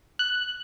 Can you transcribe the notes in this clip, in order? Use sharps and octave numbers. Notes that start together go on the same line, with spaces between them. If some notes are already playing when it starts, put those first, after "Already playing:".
F#6